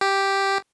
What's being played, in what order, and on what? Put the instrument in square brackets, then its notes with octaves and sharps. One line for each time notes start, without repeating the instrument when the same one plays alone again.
[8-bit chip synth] G4